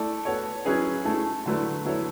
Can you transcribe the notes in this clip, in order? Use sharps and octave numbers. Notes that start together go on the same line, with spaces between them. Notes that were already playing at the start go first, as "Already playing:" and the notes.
Already playing: A3 E4 A4 D5
B3 F#4 A4 C#5
F#3 C#4 E4 G#4 B4
A3 E4 A4
D3 F#3 A3 E4 B4
F#3 B3 E4 A4 C#5